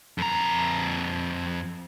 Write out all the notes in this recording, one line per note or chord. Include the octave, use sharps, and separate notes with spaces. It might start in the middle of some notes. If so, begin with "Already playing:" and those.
F2 A#5